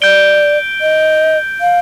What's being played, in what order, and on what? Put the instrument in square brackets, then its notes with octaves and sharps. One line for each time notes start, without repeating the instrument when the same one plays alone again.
[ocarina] D5 [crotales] G6 D7 G7
[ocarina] D#5
F5